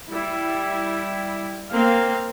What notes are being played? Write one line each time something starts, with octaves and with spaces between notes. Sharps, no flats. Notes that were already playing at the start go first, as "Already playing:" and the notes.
G3 E4
A#3 C4 F5